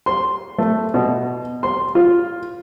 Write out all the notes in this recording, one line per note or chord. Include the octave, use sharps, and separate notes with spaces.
C6
A3
B2
C6
F4